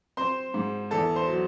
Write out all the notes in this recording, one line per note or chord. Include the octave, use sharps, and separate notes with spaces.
C4 C5 C6
G#2
E2 A4 A5
C5 C6
F#3